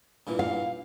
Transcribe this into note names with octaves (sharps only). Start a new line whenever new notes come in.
G2 A#2 E3
F5